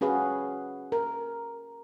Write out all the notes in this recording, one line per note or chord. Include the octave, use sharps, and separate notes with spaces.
C#4 F#4 G#4 B4 F5
A#4